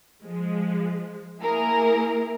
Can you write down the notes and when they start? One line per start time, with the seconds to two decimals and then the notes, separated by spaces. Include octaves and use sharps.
0.23 F3 G#3
1.41 A#3 E4 G#4 A#4